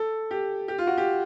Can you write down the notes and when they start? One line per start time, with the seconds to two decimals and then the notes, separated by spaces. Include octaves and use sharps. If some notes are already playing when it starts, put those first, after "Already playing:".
Already playing: A4
0.31 G4
0.68 G4
0.78 F4
0.87 F#4
0.98 G4